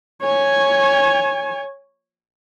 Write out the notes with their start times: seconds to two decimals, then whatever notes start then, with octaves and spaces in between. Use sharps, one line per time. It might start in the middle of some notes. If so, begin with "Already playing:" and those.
0.23 C#5 G#5